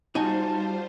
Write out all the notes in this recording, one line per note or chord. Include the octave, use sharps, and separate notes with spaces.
G3 D#4 F4 F#4 C5 G#5 A5